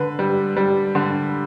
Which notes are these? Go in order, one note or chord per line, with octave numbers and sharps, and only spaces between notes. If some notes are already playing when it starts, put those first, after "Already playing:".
Already playing: D3 B4
G3
G3
D3